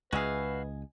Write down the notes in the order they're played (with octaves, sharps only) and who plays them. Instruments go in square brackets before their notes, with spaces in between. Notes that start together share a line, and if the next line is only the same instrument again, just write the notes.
[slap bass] C#2 [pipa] G#3 G#4 [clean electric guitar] F#4 E5 F5 [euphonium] B4